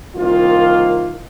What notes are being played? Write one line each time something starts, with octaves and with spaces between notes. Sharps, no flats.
C2 D#3 A#3 F4